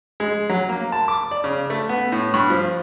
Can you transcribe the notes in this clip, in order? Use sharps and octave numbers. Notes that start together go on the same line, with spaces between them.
G#3
F#3
A#3
A5
D6
D5
C#3
A3
B3
A2
G2
F3